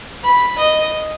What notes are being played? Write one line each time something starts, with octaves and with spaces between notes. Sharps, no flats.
B5
D#5